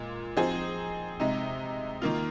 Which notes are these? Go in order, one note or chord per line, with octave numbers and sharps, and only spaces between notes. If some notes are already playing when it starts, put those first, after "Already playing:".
Already playing: A#2 G#3 F4
F3 C4 D#4 G#4 C5
C3 G#3 D#4
D#3 A#3 F4